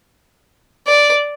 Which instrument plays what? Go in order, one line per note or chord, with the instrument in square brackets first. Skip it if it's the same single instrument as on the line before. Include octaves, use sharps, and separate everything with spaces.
[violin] D5